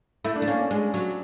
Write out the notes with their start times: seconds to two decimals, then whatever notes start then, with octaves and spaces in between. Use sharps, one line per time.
0.24 A3 E4
0.36 D4
0.42 A3
0.48 A#3 C#4
0.60 C#4
0.71 G#3 C#4
0.94 F#3